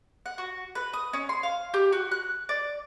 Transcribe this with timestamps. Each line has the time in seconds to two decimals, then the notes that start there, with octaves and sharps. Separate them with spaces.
0.26 F#5
0.38 F#4
0.75 B4
0.93 D#6
1.13 C#4
1.29 C6
1.43 F5
1.74 G4
1.92 F#4
2.11 F#6
2.49 D5